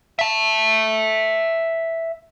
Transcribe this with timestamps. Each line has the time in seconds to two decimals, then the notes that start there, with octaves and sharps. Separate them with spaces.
0.19 E5 A5